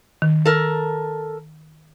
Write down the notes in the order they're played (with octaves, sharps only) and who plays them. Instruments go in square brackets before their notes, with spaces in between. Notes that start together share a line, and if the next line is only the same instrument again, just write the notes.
[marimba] D#3
[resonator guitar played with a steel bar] A4 A#4